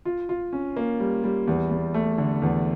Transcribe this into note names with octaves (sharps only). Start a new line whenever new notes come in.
F4
F4
C#4
A#3
G3
G3
E2
E2
A3
D3
E2